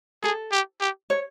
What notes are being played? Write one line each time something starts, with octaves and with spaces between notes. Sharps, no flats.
G#4 A4
G4
G4
C#5